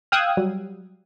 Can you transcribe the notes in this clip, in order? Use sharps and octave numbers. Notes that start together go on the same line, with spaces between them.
F5 G5 D#6 E6 F#6 G#6
F#3 G3